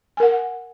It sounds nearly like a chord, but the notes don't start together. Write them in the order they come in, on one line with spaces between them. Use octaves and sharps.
G#5 A#4 F#5